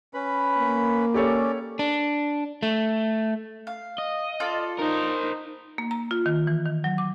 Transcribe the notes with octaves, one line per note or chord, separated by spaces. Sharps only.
C#4 B4 B5
A#3
C#4 G4 A4 C#5 D5
D4
A3
F5
D#5
F4 A4 D5
D#4 A#4 C5
A#3
A#5
F4
D#3
E3
D#3
F#3
D6